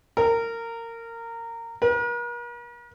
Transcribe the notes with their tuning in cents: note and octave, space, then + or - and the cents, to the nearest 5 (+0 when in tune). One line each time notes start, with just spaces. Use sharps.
A#4 -20
A#4 +45